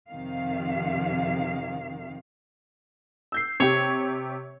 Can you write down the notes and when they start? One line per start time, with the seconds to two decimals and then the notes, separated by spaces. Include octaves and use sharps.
0.10 F2 C3 D#3 F5
3.32 E6 G6 C7
3.60 C3 G4 C#5